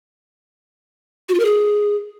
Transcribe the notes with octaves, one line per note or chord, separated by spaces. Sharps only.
F#4
F4
A#4
G#4